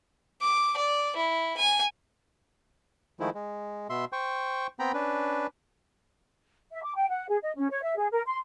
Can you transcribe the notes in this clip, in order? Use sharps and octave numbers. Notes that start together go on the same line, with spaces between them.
D6
D5
E4
G#5
D#3 F3 G#3 A3 E4
G#3
B2 E5 C6
C5 G5 C#6
B3 C4 G5 A#5 B5
C#4 D4 B4
E5
D6
G5
F#5
G#4
D#5
C#4
C#5
E5
G#4
A#4
C6